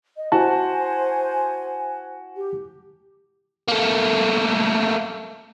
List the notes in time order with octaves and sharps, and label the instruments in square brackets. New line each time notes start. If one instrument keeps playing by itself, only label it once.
[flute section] D#5
[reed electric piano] E4 A5 [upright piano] F#4 [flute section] C5 G#5
[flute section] G4
[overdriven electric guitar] A3 A#3